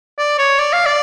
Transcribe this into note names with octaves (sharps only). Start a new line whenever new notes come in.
D5
C#5
D5
F5
D5